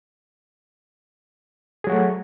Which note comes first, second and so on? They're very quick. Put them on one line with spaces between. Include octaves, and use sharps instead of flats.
G#4 F#3 F#4 A3